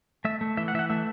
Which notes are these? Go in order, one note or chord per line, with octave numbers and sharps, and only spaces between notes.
A3 E5
A3
E3 E5
F#5
E3 E5 F#5
A3 E5